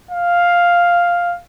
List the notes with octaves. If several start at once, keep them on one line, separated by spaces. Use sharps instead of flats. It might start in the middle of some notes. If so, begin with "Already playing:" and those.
F5